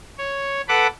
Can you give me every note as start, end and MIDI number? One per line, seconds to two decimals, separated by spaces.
0.18 0.61 73
0.68 0.87 69
0.68 0.87 71
0.68 0.87 78
0.68 0.87 83
0.68 0.87 86